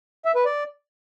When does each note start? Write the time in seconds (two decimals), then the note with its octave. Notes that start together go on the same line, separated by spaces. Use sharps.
0.25 E5
0.35 B4
0.45 D5